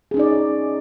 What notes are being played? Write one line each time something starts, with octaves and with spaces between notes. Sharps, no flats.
C#4 D#4 G#4 D5